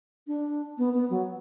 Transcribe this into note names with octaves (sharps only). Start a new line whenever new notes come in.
D4
B3
B3
F#3